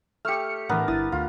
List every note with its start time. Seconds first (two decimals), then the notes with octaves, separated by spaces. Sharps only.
0.25 A3 G4 F6 C#7
0.69 A2 E3 B3 D4 A#4
0.88 G1 E4 D#6 A6
1.12 D2 F4